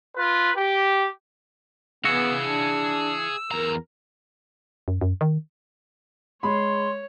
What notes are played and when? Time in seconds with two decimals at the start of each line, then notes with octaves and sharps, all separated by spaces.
0.16 F4 B4
0.56 G4
2.05 E3 B3 F#4 G#4 F5 E6
2.42 D4
3.51 E2 A#4 A#5
4.88 F#2
5.01 F#2
5.21 D#3
6.43 G#3 C#5 B5 C6